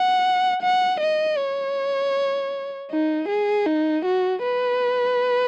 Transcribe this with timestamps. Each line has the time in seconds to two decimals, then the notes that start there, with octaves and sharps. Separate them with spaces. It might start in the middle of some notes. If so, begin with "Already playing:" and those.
Already playing: F#5
0.62 F#5
1.00 D#5
1.37 C#5
2.91 D#4
3.28 G#4
3.66 D#4
4.05 F#4
4.43 B4